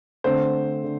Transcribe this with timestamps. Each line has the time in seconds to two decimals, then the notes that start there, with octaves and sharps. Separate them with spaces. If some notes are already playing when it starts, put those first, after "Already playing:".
0.24 D3 A3 C4 C5
0.84 D3